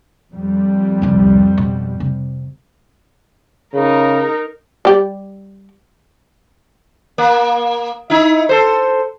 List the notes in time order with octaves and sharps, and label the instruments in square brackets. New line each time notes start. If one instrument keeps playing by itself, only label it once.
[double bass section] F2 G3
[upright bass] D#1 C2
B2
C3
[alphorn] C#3 [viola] D#4 A#4
[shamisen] G3 G4 D5
[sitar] A#3
D#4 E4
A4 C5